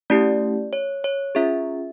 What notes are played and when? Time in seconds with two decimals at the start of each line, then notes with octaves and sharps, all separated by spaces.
0.10 A3 C#4 E4 G4 D5
0.73 C#5
1.04 C#5
1.35 C#4 F4 G#4 E5